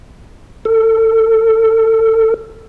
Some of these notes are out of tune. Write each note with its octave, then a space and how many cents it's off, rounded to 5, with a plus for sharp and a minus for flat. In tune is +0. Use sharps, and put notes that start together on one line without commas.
A4 +30